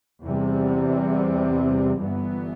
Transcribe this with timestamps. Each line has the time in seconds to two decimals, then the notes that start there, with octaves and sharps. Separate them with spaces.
0.23 E2 C3 G3
2.00 G1 G2 E3 B3